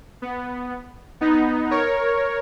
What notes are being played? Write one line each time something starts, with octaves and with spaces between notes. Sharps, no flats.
B3
B3 D#4
A#4 C#5